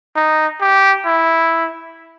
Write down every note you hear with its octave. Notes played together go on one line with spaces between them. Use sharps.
D#4
G4
E4